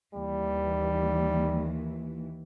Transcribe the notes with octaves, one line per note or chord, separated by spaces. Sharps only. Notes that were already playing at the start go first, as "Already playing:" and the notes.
D#2 E3 G3